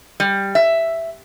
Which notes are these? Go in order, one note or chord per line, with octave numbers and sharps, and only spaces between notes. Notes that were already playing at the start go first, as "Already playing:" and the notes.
G3
E5